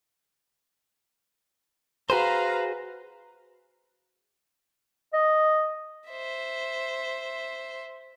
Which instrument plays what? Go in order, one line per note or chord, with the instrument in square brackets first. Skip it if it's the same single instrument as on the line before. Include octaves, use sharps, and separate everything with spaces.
[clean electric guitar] F#4 G#4 C5 [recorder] B4 [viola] F5 A#5
[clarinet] D#5
[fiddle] C5 E5